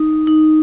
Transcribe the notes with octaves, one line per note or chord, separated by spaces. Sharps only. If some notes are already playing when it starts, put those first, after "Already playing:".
Already playing: D#4
D#4